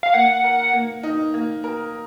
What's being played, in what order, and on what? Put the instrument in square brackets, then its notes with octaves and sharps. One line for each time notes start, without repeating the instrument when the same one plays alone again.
[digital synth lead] F5
[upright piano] A#3 [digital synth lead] F#5
[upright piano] A#4
A#3
D#4
A#3
A#4